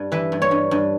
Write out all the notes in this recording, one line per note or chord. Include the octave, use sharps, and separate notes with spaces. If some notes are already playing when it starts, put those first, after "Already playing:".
Already playing: G2
E3 B4
G2
C#5
G2
G2